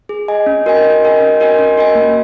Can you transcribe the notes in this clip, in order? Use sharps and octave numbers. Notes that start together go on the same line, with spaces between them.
G#4
D#5 G#5
C#4
F#4 A#4 D#5 G#5
C#4
F#4 A#4 D#5 G#5
C#4
F#4 A#4 D#5 G#5
C#4
F#4 A#4 D#5 G#5
A#3